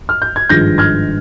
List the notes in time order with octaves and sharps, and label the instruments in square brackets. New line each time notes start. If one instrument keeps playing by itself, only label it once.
[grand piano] F6
G6
G#6
G#1 G2 F3 G#3 G6 A#6
F6 G#6